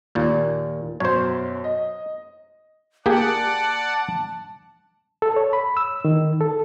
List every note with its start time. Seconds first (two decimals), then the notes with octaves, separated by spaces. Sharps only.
0.15 D#2 A#2
1.00 F#2 B2 F#3 C5 C#5
1.64 D#5
3.06 A#3 G4 G#4 D5 F#5 A5
5.22 A4
5.36 C#5
5.53 B5
5.77 E6
6.05 D#3
6.41 A4